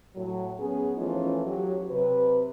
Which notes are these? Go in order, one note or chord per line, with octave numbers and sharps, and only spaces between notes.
A2 F#3
B3 C#4 G#4
E3 F3 A3 C#4 D#4 F4
F#3 G4
C3 B4